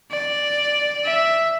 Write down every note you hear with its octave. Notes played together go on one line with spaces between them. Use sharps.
D5
E5